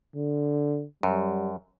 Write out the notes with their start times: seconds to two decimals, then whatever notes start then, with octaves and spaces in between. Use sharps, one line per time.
0.16 D3
1.03 F#2 G3